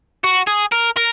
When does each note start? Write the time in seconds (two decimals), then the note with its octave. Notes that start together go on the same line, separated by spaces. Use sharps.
0.24 F#4
0.47 G#4
0.72 A#4
0.97 A#4